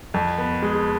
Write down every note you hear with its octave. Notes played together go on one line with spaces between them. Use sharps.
F2
B3
G#3